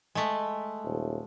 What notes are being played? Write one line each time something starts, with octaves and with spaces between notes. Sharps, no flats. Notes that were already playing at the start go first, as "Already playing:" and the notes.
G#3 A3
D#1